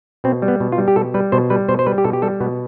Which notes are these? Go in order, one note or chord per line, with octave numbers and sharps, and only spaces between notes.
B2 C4
G3
B3
B2
F4
G3
G4
B2 A4
G3 B4
B2 C5
G3 B4
B2 C5
C5
G3 B4
G4
B2 A4
G4
G3 A4
B2 B3